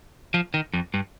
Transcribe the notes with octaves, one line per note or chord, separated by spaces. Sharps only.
F3
D#3
F2
G2